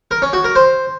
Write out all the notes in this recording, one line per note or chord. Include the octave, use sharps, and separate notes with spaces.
A#4
C#4
F#4
A#4
C5